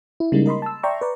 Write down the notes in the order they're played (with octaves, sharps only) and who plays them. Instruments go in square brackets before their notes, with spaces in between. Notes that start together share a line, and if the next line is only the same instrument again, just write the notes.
[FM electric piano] E4
C#3 G3 G#3 A#3 D#4
A#4 D#5 B5 C6
A5 E6
D5 E5 G5 A#5 C6 C#6
B4 D5 A#5